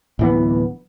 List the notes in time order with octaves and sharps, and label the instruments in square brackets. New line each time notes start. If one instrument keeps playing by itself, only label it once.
[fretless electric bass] D1 E3 B3